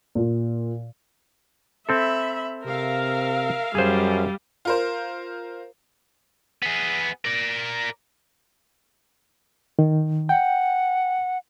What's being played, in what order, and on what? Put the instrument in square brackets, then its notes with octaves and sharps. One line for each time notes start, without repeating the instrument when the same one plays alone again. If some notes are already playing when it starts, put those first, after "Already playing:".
[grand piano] A#2
[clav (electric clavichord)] C4 A4 [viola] E5 B5
[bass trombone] C3 [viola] A#4 [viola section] E5 F5
[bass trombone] F#2 [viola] G3 [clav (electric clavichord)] G#4 C5
[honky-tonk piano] F4 A#4 C5
[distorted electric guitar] B3 G#4
A#4 D5
[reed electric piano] D#3
[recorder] F#5 [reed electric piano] G5